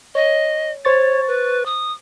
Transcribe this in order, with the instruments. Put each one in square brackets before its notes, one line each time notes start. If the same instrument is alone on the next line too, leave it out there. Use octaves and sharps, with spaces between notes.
[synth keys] C#5 [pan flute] D#5
[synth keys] C5 C#6 A6 [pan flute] C#5
[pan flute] B4
D#6